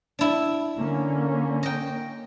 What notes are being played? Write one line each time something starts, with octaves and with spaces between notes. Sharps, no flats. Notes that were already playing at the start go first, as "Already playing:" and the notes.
D4 E4
D3 A#3 C#4
D#5 G5